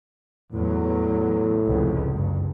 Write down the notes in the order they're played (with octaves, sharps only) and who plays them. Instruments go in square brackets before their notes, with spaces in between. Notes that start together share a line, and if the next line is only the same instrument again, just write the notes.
[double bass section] E2 F#3 [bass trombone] A2
[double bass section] F1 C#2
F#1 G2